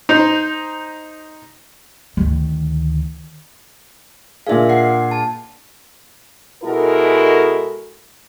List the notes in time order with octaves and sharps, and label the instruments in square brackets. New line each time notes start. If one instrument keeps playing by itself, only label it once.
[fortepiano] D#4 C5
[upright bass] D2 D#3
[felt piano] A#2 D4 G#4 [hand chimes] E5 F5
[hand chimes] F#5 C7
A5
[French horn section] B2 G#3 E4 F#4 A4 A#4